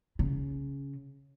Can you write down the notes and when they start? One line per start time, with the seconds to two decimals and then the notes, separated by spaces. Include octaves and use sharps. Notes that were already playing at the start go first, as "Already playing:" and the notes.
0.19 C#3